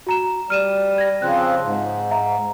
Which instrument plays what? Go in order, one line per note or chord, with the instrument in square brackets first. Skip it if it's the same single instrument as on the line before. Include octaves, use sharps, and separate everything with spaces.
[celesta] F#4 A#5 E7
[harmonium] G3 [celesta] F6 D#7 E7
[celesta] G#6 A#6
[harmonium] C#3 F3 C4 [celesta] F#6
[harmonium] G#2
[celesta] E5 A#5